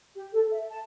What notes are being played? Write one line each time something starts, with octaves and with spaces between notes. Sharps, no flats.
G4
A4
E5
A5